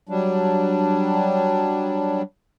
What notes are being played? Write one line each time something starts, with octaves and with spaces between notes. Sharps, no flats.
F#3 G3 D4